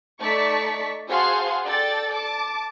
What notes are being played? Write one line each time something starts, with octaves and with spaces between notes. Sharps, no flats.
A3 D#4 D5 A5 C#6 B6
F#4 G#4 C5 F5 A5 C6
A4 D5 G5 A6
A5 D6